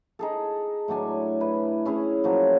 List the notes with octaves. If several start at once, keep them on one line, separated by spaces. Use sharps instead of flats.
D#4 G#4 A4
A2 F#3 D4 G#5
E4 B4
C#4 E4 G#4 C#5
A#2 F3 F#3